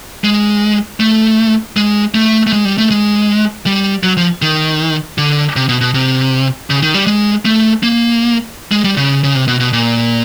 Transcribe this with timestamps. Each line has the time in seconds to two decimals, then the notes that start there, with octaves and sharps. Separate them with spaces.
0.24 G#3
1.00 A3
1.77 G#3
2.15 A3
2.47 A3
2.53 G#3
2.65 G3
2.78 A3
2.91 G#3
3.66 G3
4.03 F#3
4.17 F3
4.42 D#3
5.18 D3
5.56 C3
5.69 B2
5.81 B2
5.94 C3
6.70 C#3
6.83 D#3
6.94 G3
7.07 G#3
7.45 A3
7.83 A#3
8.72 G#3
8.84 G3
8.97 C#3
9.24 C#3
9.35 C3
9.48 B2
9.60 B2
9.73 A#2